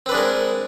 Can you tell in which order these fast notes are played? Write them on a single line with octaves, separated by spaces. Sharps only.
C4 B4 D4 G#3 A#4